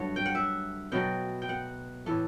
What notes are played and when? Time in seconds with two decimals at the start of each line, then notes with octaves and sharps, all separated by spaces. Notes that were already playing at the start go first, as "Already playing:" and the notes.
Already playing: G2 F#3 A3 C#5
0.16 G5
0.25 F#5
0.35 E5
0.92 B2 F#3 A3 G5
1.42 G5
1.49 F#5
2.06 A2 E3 A3